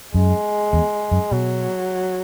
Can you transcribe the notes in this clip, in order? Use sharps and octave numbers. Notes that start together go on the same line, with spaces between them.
F#2 G#3
E2
F#2
B2 F#3